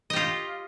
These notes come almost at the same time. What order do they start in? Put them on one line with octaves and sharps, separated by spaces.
D#5 G4 F4